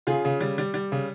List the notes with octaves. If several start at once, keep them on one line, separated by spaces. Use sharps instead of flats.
C#3 F4 G#4
C#3
G3
G3
G3
C#3